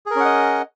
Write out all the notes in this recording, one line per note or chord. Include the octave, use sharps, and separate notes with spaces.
C#4 G#4 A#4 D#5 F#5